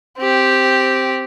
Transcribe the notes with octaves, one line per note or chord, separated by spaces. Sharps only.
C4 G4